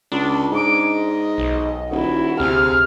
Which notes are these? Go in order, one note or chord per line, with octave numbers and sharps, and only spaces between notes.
C#2 D4
G#2 G#3 D6
D#5
B1
D#1 E4 F#4
D2 C3 G#4 F6